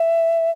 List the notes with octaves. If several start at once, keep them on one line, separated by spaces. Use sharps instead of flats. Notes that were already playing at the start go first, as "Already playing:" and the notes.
Already playing: E5